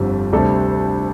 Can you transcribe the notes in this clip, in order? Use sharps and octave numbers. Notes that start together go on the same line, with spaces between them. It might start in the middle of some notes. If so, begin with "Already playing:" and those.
Already playing: G1 F2 D3 G3 C4
D2 C3 G3 D4 A4